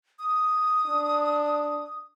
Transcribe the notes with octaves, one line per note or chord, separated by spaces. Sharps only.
D#6
D4